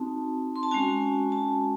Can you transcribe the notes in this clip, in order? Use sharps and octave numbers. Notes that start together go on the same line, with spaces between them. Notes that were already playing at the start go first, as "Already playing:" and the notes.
Already playing: C4 D#4 F#4 A5
C6
A5
G#3 C#4 F#4 G#5
A5